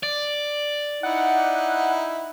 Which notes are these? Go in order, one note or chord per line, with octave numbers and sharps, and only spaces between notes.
D5
D#4 E4 F#5